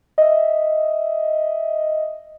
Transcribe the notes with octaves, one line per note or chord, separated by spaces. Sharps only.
D#5 E5